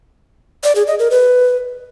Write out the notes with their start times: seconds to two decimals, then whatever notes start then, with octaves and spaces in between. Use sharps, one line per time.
0.64 D5
0.75 G#4
0.87 D#5
0.99 A#4
1.11 B4